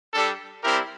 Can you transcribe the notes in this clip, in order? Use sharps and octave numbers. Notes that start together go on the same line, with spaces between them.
G3 D4 G4 A4
G3 C4 E4 G4 A#4